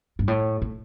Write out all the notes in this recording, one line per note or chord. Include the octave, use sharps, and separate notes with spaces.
G2
A2
A2